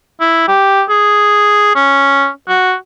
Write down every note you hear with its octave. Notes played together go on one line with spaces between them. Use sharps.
E4
G4
G#4
C#4
F#4